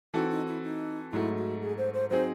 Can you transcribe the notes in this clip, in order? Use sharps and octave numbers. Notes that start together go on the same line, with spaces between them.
E3 C4 D#4 F#4 A4
D#4
E4
D#4
G#2 F#3 A3 E4
F#4
G#4
C5
C5
F#3 C4 D#4 G#4 C5